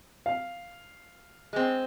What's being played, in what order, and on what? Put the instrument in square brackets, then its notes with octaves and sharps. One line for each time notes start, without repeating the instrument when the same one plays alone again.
[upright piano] F5
[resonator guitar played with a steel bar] G#3 C4